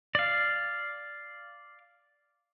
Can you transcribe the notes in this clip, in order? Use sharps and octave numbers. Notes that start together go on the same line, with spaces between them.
D5 F5